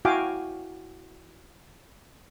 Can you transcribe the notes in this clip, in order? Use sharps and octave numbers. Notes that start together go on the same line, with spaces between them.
E4 F#4 F5 G5 G#5 D6